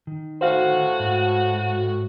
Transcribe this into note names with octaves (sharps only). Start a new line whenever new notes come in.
D#3
A2 F#4 C5 F5
G#2